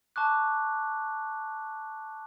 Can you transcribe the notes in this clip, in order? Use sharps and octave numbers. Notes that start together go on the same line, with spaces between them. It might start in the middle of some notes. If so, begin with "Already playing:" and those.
A5 C#6 D6 F#6